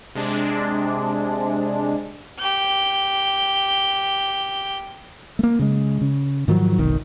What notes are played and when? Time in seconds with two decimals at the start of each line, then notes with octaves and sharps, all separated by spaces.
0.15 C3 G#3 D4
2.39 G4 G6
5.39 A3 A#3
5.59 C#3 G#3
6.01 C#3
6.48 G#2 D#3 F3 F#3
6.79 F1 B1 D#3